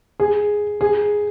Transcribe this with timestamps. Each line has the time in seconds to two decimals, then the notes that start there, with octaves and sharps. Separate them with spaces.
0.20 G#4
0.81 G#4